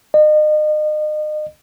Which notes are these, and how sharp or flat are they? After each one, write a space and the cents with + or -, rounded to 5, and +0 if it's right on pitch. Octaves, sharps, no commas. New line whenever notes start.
D#5 -35